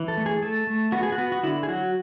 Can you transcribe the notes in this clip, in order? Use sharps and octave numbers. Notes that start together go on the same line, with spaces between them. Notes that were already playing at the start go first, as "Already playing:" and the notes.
Already playing: E3
A4
A3
G#4
A3 A4
A3
B3 F#4
G#4
F#4
B3
F#4
D3 E4
G#4
F#3 F#4